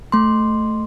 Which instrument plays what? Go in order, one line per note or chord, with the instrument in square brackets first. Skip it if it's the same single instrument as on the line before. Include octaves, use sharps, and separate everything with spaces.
[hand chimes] A3 C6